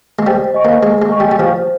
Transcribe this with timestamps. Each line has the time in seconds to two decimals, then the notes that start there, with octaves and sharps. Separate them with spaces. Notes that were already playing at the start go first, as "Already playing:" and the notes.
0.19 G#3
0.27 G3 C5
0.54 D#5 G#5 C#6
0.65 A#3
0.82 G#3 G#4
1.02 G#3
1.10 D#5 G#5 C#6
1.20 G3
1.31 G3
1.39 F3 C5